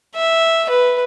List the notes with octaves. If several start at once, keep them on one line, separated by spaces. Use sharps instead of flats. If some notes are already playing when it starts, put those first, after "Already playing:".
E5
B4